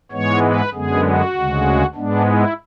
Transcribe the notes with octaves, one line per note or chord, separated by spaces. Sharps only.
G#2 E3 G#3 B3 C#5
B4
F#2 D3 G#3 B3 G#4
F#4
D2 C#3 G#3
G#2 G#3 B3 D4
E4